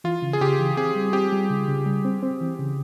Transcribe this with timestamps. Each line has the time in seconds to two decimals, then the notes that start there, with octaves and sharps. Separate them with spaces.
0.04 E3 F4
0.22 C#3
0.33 G#4
0.41 C#3 G4
0.60 E3
0.77 C4 G#4
0.95 G3
1.13 C4 G4
1.32 G3
1.50 C#3
1.68 C#3
1.86 G3
2.05 C4
2.22 C4
2.41 E3
2.59 C#3